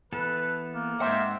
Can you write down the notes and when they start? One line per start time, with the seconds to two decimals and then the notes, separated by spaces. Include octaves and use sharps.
0.13 E3 B3 A4 B4
0.73 A#3
1.00 G#2 C4 E5 F#5 E6